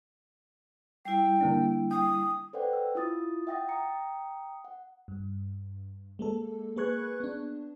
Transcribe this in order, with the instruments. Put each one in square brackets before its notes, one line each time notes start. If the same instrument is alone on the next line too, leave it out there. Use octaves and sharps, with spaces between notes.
[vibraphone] G3 E4 [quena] G5
[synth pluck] D3 A#3 D4
[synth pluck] G5 [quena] D#6
[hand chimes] A4 B4 C5 D5 F#5 G5
E6
E4 F4 D#6 A6
E5 F#5 G5 D#6 A6 A#6
G5 A#5 D#6 C#7
F#5
[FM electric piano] G2
G#3 A#3 A4
A#3 G#4 B4 C#6 F#6 G#6
B3 D4